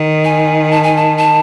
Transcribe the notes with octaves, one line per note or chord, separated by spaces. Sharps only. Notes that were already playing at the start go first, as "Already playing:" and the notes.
Already playing: D#3
G#5
A5
G#5
A5
A5